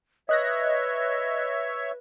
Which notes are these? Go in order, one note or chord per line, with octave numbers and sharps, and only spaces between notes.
B4 C#5 D#5 E5 F#6 A#6